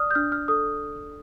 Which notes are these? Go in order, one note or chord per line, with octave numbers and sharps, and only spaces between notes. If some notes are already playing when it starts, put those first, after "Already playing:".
Already playing: D5 D#6 F6
G6
D4 F6
F6
A4 D#6